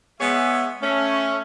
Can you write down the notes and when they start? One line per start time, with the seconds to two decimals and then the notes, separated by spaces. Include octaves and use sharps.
0.20 G#3 B3 G#4 C#5 E5
0.82 A3 C#4